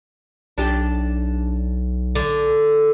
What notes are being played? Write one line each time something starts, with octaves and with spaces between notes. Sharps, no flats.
B1 D4 G4
D3